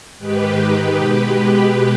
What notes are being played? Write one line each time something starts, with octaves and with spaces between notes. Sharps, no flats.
G#2 D#3 G#3 G4 B4
B2 G#3